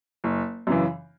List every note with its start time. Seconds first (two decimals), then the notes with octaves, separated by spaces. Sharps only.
0.24 F#1
0.67 F#2 C#3 E3